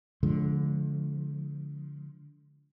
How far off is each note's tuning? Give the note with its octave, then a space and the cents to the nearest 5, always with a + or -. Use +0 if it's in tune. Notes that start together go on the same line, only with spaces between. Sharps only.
D3 -20 F3 +0 G#3 +30